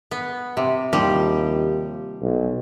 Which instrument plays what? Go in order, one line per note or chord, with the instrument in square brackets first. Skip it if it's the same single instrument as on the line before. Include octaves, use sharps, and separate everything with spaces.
[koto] B3
C3
[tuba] D#2 [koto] F3 G3 G4
[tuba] B1